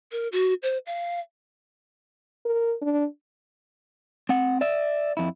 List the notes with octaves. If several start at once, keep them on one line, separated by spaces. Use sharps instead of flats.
A#4
F#4
C5
F5
A#4
D4
C4 F#5
D5 E5
F2 E4